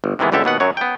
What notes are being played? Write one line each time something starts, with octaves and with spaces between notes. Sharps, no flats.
G1
C3 D#3 E3 G#3 B3
G1 C#2 D3 G4 A4 E5
D#2 B2 B3 F#5
F#2 F#3 C#5
B3 G5